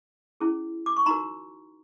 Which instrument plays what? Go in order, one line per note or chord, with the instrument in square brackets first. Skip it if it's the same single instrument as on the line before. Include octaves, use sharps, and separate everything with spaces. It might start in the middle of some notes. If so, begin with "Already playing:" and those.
[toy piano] C#4 E4 G#4
D6
C#6
D#4 F#4 A#4 A#5 C6